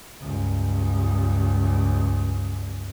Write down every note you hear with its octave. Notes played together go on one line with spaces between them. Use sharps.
C#2 G2